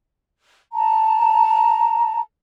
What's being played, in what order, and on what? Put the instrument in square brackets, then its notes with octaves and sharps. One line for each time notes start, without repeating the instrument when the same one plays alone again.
[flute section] A5 A#5